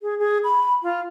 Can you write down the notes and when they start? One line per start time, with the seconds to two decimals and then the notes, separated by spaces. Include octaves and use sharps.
0.01 G#4
0.19 G#4
0.44 B5
0.83 F4